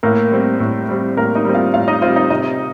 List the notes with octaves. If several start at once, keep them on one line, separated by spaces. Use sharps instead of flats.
A2 A#3 A#4
G3 C4
A2
G3 C4
A2 A#3 A#4
D#4 D#5
G3 C4
F4 F5
A2 F4 F5
D#4 D#5
G3 C4 F4 F5
D#4 D#5
C3 D#4 D#5